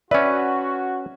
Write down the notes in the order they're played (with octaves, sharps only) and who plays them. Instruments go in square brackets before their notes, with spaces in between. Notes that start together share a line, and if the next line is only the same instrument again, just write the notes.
[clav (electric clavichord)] C#4 B4 [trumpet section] F#4 [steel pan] D5 E5